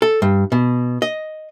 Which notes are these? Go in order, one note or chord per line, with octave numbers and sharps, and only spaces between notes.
A4
G2
B2
D#5